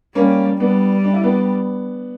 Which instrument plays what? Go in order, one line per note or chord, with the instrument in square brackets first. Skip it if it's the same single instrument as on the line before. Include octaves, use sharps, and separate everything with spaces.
[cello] G3 [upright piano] A#3 C#4
[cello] G3 [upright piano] B3 D4
[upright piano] D4
E4
B3 D4